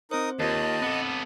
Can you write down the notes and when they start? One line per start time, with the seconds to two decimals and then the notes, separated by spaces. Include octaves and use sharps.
0.11 C4 D#4 A#4 C5 D#6
0.40 D#2 F4 G4 A#4 D#5 A5
0.82 B3 C4 A4 F#5 D6